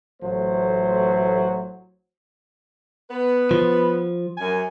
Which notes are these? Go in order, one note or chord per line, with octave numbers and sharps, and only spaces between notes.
A1 F#3 A3 C5
B3 B4
F3
F#2 G#5